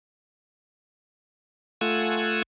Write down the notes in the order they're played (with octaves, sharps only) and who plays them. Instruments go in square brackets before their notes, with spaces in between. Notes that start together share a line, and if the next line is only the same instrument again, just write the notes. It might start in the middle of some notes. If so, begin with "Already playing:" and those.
[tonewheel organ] A3 F4 F#5 G#5 E6